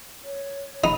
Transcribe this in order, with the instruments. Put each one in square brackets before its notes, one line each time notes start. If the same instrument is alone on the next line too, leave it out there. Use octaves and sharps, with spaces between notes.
[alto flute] C#5
[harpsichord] D#4 [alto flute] B5